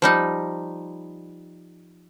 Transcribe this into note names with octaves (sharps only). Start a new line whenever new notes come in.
F3 G3 D#4